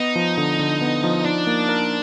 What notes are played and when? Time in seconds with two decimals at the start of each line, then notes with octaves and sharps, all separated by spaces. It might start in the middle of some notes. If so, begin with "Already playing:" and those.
Already playing: B3 D#4
0.16 F3
0.38 D3
0.59 D3
0.81 B3
1.04 F3
1.25 D4 D#4
1.47 A#3
1.69 A#4